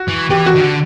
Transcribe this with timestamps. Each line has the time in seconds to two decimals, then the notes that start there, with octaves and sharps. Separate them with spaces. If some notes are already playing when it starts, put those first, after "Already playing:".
Already playing: F#4
0.09 E3
0.30 E3 G4
0.46 F#4
0.56 D#3
0.61 D3